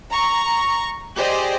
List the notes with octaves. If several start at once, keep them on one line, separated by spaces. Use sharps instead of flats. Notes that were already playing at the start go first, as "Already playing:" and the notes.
A#5 C#6
G4 G#4 C5 D5 D#5